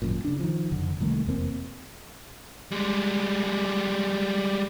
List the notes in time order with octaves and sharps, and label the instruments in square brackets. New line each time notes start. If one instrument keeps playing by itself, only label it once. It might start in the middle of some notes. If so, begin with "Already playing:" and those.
[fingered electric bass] G#1 F#2 A#2
C#3 D4
D#3 F3
F#1 F2 D3
C2 D#3 A3 A#3
F1 E2 A#3 C4
[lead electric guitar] G3 G#3